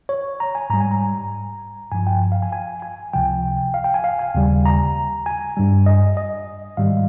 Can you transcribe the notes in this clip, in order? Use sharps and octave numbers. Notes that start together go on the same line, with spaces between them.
C#5
A#5
G#5
G#2 G3 A#5
G#5
A#5
G2 F3 G#5
G5
F5
G#5
G#5
G#5
C#2 C3 F3 G5
F5
G5
G#5
F5
G#5
D#2 C#3 G3
A#5
G#5
G2 G3
D#5
D#5
G#2 D#3 G3 F5